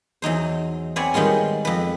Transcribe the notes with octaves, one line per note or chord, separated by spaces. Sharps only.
E2 F#3 D#4 C5
C4 B4 C#5 D5 F#5 G#5
D#3 G3 G#3 B3 F4
F2 B4